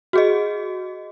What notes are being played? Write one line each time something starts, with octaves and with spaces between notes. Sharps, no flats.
F#4 G#4 D#5